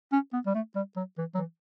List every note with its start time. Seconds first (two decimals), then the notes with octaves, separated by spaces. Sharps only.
0.12 C#4
0.33 B3
0.46 G3
0.55 A3
0.75 G3
0.96 F#3
1.18 E3
1.35 F#3
1.38 E3